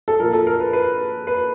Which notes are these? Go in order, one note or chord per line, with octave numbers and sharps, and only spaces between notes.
A4
A#2 F3 A#4
A4
A#4
B4
B4
B4